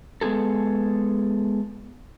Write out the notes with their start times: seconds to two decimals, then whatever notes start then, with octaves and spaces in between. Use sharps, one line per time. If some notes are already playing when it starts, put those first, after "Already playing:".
0.21 G#3 B3 E4 G#4 A4